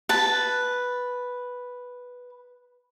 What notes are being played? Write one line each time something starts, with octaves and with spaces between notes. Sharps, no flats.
B4 A5